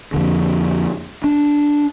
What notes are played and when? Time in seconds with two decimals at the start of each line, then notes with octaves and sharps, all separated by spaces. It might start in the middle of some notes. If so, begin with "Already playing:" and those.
0.14 F2 D3
1.24 D4